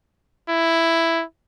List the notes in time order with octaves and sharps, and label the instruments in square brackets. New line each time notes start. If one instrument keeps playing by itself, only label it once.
[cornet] E4